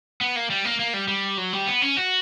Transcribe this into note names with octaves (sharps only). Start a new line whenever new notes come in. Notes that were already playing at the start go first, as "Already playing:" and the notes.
B3
A#3
G3
A#3
A#3
G3
G3
F#3
G3
B3
C#4
F#4